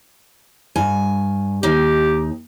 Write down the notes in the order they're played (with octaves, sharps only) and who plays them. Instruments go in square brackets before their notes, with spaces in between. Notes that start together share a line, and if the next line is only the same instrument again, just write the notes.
[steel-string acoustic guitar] G2 G#5
[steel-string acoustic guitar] D#2 D#4 [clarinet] G4